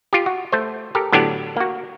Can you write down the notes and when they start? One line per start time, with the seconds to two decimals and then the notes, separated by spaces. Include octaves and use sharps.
0.13 F4 G4
0.26 F#4
0.52 A3 C5
0.95 G4 A4 A#4
1.12 A2 D3 F#3 B3 D4 G4
1.57 A#3 F#4